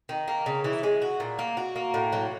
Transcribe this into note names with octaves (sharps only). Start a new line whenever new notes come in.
D#3
A#3
C#3
E3
G#3
F#4
A#2
A#3
F#4
A#3
A2
F#3